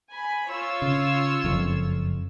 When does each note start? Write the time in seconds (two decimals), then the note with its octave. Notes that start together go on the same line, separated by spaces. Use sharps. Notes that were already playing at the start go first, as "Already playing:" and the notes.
0.11 G#5 B5
0.47 F4 C#5 E6
0.82 C#3
1.44 F#1 F2